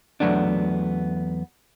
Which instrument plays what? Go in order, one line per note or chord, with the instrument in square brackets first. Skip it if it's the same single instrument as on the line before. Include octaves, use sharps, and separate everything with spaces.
[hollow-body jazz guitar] E2 A2 F#3 A3 B3 D4